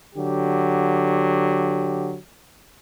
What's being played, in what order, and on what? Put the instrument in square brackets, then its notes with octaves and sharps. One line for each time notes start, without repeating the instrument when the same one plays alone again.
[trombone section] D3 F#3 G4